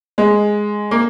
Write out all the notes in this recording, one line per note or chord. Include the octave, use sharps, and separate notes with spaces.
G#3
A#3